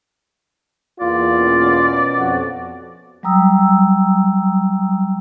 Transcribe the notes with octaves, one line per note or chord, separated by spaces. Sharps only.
E2 A#3 F4 D5
B2 B3 C#4
F2 F#4
F#3 G3 G5 A#5 D#6 E6